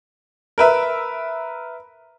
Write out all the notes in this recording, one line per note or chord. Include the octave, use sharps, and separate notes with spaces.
A#4 B4 E5